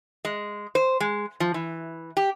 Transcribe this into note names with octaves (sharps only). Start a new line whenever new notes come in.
G#3
C5
G#3
F3
E3
G4